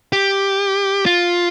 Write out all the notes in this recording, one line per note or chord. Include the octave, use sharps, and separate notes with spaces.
G4
F4